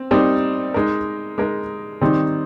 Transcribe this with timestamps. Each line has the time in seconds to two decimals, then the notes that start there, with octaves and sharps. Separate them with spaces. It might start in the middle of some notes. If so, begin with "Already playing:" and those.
Already playing: C4
0.11 G3 C4 D#4 A#4
0.74 G#3 D#4 A#4
1.38 G#3 D#4 A#4
2.01 D#3 G3 C4 D#4